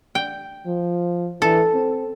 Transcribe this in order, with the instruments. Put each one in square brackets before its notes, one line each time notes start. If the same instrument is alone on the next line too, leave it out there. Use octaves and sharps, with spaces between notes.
[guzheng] G5
[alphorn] F3
[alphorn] E3 [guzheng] A4
[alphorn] C4